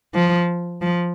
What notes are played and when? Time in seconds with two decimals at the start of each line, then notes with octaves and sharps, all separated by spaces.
0.14 F3
0.82 F3